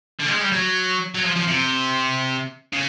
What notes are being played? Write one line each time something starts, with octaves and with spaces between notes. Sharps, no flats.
D3
G3
G#3
G3
F#3
F#3
F3
F3
C3
C#3